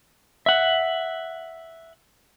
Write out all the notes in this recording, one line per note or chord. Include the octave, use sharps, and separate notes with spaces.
E5 F#5